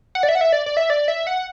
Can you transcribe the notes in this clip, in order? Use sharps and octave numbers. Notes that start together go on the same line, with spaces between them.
F#5
D5
E5
F#5
E5
D5
D5
E5
D5
E5
F#5